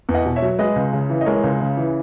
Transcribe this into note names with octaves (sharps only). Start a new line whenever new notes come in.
E2
D#5 F#5
B2
C#5 E5
F#3
G#3 B4 D#5
C#2
C#3
E3
D#5
G#3 A#4 C#5
C#2
C#3
E3